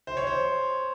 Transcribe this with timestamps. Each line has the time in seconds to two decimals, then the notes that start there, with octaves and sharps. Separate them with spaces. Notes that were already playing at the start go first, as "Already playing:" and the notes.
0.07 C5
0.17 C#5
0.27 C5